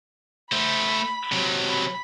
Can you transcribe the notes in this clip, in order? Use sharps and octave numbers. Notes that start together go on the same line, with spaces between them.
A3 C5 B5
C3 F#3
B5